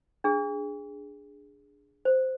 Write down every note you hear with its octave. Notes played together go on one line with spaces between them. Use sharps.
D4 G#4
C5